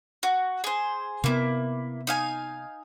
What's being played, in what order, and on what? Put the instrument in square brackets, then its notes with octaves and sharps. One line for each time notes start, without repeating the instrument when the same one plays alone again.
[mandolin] F#4
G#4 C5
[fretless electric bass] C3 B3 [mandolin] A#3 E4
[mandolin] D#4 F5 G#5